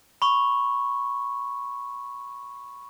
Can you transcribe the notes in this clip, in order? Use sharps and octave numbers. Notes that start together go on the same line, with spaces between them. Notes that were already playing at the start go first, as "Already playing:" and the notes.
B5 C#6